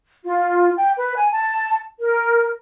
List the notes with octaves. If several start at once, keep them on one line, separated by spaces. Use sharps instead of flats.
F4
G5
B4
G#5
A5
A#4